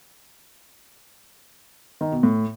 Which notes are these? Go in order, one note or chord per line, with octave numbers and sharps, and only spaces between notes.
D#3
B2
A2